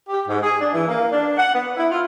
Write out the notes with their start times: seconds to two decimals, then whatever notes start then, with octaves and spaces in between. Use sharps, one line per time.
0.09 G4
0.27 G#2
0.43 G#4
0.60 D4
0.74 E3
0.88 A#3
1.11 D4
1.37 F#5
1.54 B3
1.77 E4
1.91 F4